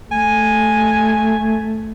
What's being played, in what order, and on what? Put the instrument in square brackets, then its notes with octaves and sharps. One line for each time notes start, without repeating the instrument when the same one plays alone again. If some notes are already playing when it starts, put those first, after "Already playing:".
[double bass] A3 [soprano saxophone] G#5